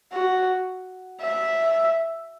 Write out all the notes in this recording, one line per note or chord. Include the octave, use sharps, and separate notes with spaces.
F#4
E5